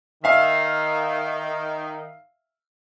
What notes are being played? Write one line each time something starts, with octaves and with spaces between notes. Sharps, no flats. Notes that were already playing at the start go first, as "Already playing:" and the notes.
D#3 E5 F5